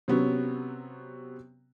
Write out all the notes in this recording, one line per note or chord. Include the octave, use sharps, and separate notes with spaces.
C3 F#3 B3 C#4